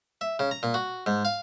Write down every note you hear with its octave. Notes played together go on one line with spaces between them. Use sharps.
E5
C#3
A#5
A#2
F#4
G#2
F5